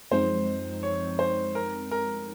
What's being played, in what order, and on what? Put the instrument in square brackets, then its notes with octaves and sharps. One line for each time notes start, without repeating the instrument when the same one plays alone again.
[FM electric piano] F#2 F3 G#3 C4 D#4 [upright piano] C5
[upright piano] C#5
C5
A#4
A#4